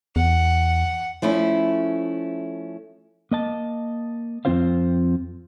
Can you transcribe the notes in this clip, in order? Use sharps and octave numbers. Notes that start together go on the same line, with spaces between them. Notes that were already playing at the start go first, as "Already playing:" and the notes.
E2 F#5
F3 A3 C#4 E4
A#3 D#5 A5
F2 G3 C4 F4 C5 F5